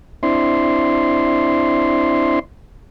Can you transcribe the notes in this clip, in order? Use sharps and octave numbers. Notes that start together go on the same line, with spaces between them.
C4 D4 E4 C6